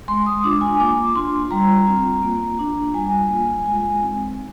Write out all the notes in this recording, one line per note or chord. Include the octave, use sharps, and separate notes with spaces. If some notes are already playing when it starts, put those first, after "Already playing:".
G#3 C6
D#6
D4 F4 D6
G#5
A#3 D6
D4 F4 C6
G3 A#5
C4 F4
A#3
D4 F4
G3 G#5
A#3 F4
G#3 G#5
C4 D#4